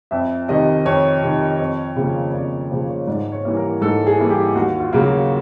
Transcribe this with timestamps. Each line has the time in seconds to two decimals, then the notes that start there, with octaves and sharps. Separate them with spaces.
0.11 F2 E5
0.48 C3 D#3 D#5
0.85 F2 C#5
1.22 C3 D#3
1.60 F2
1.96 C#3 F3 A#3
2.33 F2 D5
2.71 C#3 F3 A#3 C5
2.89 C#5
3.07 G#2 D5
3.32 C#5
3.45 E3 G3 A#3
3.57 A#4
3.81 G#2 A4
4.07 G#4
4.18 E3 G3 A#3
4.30 G4
4.55 D#2 F#4
4.80 F4
4.93 C#3 F#3 A#3
5.05 F#4